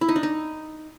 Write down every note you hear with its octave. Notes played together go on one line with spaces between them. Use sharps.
E4
D#4
D4
D#4